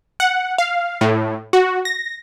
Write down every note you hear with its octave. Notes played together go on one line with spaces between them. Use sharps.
F#5
F5
A2
F#4
A#6